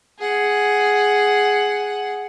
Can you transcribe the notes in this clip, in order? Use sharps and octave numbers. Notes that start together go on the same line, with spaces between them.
G#4 F#5